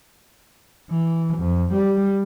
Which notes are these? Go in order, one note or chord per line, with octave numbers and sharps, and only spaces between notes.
E3
F2
G3